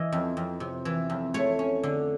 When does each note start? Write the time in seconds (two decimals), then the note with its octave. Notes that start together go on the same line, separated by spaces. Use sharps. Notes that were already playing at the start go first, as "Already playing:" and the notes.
Already playing: E3 D#5
0.12 F2
0.37 F2
0.60 C3
0.85 E3
1.10 F2
1.34 A3 C#5
1.59 C#4
1.83 D3